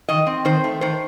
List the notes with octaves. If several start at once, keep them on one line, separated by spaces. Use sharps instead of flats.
D#3 D#5
C4
D#3 C5
A3
D#3 C5